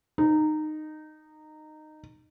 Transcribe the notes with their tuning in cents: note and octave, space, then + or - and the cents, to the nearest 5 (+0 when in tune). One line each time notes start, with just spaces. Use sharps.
D#4 -15